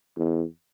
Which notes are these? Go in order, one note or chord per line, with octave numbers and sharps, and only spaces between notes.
E2